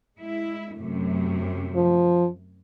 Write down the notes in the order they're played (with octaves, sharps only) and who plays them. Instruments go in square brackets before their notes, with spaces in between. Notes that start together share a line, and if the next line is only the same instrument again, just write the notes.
[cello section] G#3 E4
F#2 C3 A3
[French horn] F3